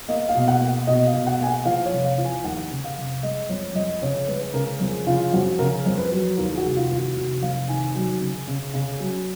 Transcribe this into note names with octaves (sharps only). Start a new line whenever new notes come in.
A#3 D#5
F5
B2
F#5
A#3
F#5
B2 D#5
F5
B2
F#5
A#3 G#5
F#5
F3 F5
C#5
F1
F5
F3
G#5
D#2 F#5
C#3
F5
F1
G#3 D#5
F2 C#5
F2 D#5
C#3 C#5
G#3 B4
C#3 A#4
F2 G#4
C#3 F4
F2 F#4
C#3 A#4
F2
B4
F#3
D#2 A#4
G#4
F#4
F1
F4
D#2
F#4
F1 F#4
F1 F5
D#3 G#5
F#3 G#5
C#3
C#3
C#3
F#3